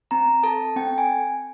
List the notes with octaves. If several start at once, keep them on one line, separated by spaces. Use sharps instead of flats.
C4 A#5
A4 A5
C4 G5
G#5